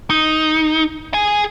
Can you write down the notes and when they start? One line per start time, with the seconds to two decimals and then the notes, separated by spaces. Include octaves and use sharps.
0.10 D#4
1.14 G#4 G#5